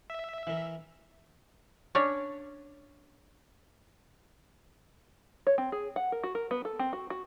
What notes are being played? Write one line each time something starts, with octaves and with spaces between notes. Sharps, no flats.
E5
E3 A#4
C#4 D4 C#5
C#5
C4
G#4
F#5
A#4
F#4
A#4
B3
A4
C4
F#4
F#4